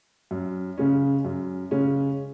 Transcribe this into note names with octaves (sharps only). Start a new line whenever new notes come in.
F#2
C#3 G#3 C#4
F#2
C#3 G#3 C#4